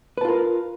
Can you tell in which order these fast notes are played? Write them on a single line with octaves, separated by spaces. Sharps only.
B4 A5 F4 A#4